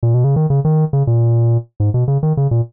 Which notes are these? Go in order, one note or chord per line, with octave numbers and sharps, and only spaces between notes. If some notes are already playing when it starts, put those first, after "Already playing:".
A#2
B2
C#3
D#3
C#3
D#3
C#3
A#2
G#2
B2
C#3
D#3
C#3
A#2